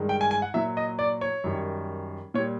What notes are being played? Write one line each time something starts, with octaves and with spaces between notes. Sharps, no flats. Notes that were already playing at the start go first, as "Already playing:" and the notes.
Already playing: G2 D#3 G#3
G5
G#5
G#5
F#5
A#2 F#3 E5
D#5
D5
C#5
F#2 D#3 G3
A#2 G3 C#5